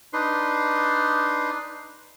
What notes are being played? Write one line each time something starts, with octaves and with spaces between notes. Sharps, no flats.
D4 D#4 B4 C6